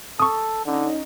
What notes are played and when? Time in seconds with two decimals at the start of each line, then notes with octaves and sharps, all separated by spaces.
0.20 A4 C#6 D#6
0.66 D3 C#4 D#4